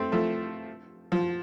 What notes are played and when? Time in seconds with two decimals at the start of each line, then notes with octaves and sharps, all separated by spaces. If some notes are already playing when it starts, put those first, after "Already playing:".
Already playing: A3 C4
0.12 F3 A3
1.12 F3